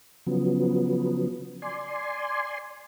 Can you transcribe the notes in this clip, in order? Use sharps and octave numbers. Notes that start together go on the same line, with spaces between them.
C#3 F3 F#3 B3
D5 G#5 C6